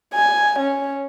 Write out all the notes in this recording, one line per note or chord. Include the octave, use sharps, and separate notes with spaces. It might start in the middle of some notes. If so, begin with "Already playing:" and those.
G#5
C#4